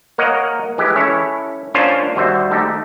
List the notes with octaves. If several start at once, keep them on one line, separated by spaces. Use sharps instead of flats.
A#3 A#4 C#5 D#5 F#5
E3 G#3 G4
C#4 E4 A4 C#5
A#3 C#4 D4 F4 C5 C#5
D#2 G3 F#4 C5 E5
A3 D#4 G4 A4